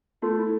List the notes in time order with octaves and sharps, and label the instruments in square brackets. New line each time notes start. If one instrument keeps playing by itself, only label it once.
[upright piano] A3 [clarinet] F4
[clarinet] E4